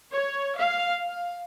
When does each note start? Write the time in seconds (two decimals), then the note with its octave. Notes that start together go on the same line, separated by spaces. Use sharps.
0.13 C#5
0.56 F5
1.08 F5